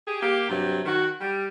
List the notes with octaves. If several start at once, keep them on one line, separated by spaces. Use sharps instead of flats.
G4 G#4
A#3 G4
G2 C3 F#3
D#3 F#4
G3